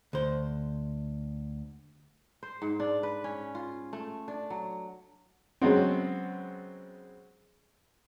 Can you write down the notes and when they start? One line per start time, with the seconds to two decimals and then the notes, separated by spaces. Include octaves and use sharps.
0.13 D2 C5
2.43 C5
2.62 G#2
2.80 D4
3.03 B4
3.24 C#4
3.55 F4
3.93 A3
4.28 D4
4.50 F#3
5.62 C#3 F#3 G#3 B3 C4